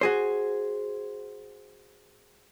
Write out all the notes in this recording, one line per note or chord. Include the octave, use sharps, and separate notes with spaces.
F#4 G#4 C5